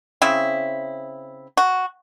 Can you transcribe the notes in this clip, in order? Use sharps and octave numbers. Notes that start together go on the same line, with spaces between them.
C#3 C4 E4
F#4